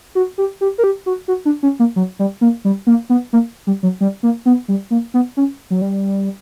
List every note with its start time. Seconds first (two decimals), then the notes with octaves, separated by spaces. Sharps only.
0.15 F#4
0.38 G4
0.61 G4
0.78 A#4
0.84 G4
1.06 F#4
1.28 F#4
1.45 D4
1.63 C#4
1.79 A#3
1.96 F#3
2.19 G3
2.41 A#3
2.65 G3
2.87 A#3
3.10 B3
3.33 A#3
3.67 G3
3.83 F#3
4.01 G3
4.23 A#3
4.46 B3
4.68 G3
4.91 A#3
5.14 B3
5.37 C#4
5.70 F#3
5.82 G3